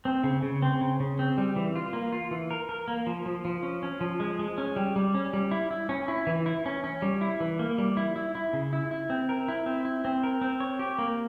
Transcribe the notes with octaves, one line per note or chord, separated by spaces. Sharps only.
C4
C#3
C#3
C4
C#3
C#3
C4
G3
E3
F4
A#3
F4
E3
A#4
A#4
A#3
F3
F3
F3
C#4
C#4
F3
G#3
G#3
C#4
G3
G3
C#4
G3
E4
E4
C#4
E4
E3
E4
C#4
C#4
G3
E4
E3
A#3
G3
E4
E4
E4
C#3
E4
E4
C4
A#4
E4
C4
E4
C4
A#4
C4
C#5
G4
A#3